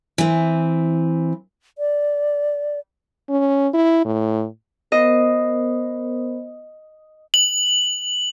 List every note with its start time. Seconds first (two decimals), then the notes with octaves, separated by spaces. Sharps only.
0.18 E3 C4
1.78 D5
3.29 C#4
3.74 E4
4.05 A2
4.92 B3 A#4 C5 D#5
7.34 F#7